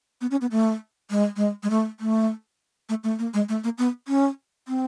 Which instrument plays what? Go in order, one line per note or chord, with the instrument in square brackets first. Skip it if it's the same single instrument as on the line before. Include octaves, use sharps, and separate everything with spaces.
[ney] B3
C#4
B3
A3
G#3
G#3
G#3
A3
A3
A3
A3
A#3
G#3
A3
A#3
B3
C#4
C4